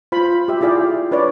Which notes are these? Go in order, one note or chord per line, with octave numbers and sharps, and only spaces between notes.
F4 C5 B5
G4 E5
E4 F4 G#4 D5 F5 G5
D4 B4 C#5 D5